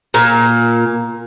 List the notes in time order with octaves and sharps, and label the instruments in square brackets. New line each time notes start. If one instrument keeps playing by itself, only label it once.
[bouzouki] A#2